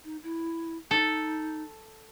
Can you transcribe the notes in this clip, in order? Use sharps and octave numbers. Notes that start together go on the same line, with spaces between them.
D#4
E4
D#4 A4